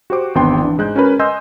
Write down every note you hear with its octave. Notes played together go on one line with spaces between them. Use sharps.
F#4 G4 C5 D6
G#1 E2 B3 D4 G5 C6
E3 D4
G#2 G#3 F#6 G6
C#4 F#4 A#4 B4
D#5 G#5 C6 E6 G6